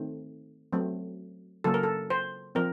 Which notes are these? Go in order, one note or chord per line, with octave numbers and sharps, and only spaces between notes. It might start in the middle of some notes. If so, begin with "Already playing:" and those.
Already playing: D#3 A3 C4
F#3 A3 C4
C#3 F#3 A#3 C#4 A4
A#4
A4
C5
F3 C4 A#4